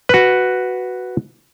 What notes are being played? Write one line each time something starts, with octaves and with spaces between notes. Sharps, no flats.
F#4 B4